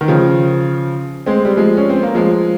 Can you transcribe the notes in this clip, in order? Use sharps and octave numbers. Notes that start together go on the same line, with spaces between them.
D#3
C#3 F3
G#3 C4
G3
F3 G#3
C#4
C4
A#3
F3 G#3